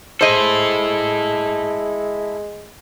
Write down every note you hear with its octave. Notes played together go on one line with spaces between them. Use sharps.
G#3 E4 A4 C5 D#5